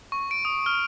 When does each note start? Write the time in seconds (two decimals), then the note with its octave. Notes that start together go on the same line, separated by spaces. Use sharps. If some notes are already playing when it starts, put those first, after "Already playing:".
0.12 C#6
0.31 D7
0.45 D#6
0.66 F6